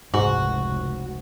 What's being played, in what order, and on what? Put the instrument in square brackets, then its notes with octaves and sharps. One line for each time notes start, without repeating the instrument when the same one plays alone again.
[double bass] F1 C#2 [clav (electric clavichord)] G#2 [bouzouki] F#4